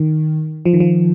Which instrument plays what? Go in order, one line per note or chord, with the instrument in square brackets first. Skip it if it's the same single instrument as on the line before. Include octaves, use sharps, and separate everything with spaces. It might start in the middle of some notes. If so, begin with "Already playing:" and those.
Already playing: [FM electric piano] D#3
F3
D#3
F3